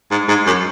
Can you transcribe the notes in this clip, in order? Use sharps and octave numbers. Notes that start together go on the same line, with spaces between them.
G#2
G#2
F#2